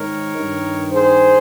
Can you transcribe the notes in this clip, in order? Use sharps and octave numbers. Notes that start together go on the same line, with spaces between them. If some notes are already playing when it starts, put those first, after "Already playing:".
Already playing: G#2 D#3 A#4 C#5
G2 D#3
G#4 C5